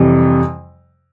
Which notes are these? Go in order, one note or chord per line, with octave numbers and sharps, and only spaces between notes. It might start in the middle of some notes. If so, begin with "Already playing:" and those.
Already playing: F2 C3 E3 G3